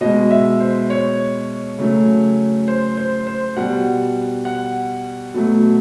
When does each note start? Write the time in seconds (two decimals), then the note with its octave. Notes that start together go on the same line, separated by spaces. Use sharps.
0.01 B2 G#3 D#5
0.31 E5
0.60 C5
0.90 C#5
1.79 C#3 F#3 A3
2.68 C5
2.97 C5
3.27 C5
3.56 B2 G3 F#5
4.45 F#5
5.34 B2 F#3 A3